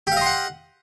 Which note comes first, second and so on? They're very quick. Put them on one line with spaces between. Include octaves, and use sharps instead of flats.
G4 F5 D#5 C6 F#5